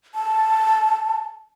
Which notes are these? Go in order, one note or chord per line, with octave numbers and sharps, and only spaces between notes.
A5